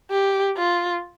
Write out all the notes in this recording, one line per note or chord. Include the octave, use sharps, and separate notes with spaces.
G4
F4